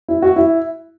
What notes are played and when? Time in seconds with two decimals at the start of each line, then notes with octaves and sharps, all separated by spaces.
0.08 E4
0.22 F#4
0.36 E4